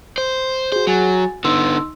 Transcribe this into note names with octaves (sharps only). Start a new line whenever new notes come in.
C5
F#4 G#4 C5
F#3 F#4 G#5 A6
D3 B3 D#4 C6 E6